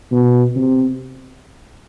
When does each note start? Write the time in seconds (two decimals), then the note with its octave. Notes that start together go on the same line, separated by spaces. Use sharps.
0.12 B2
0.56 C3